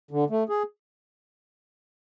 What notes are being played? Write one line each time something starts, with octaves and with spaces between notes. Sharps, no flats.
D3
A3
G#4